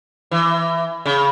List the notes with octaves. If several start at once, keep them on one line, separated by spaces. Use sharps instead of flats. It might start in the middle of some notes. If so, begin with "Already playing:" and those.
E3
C#3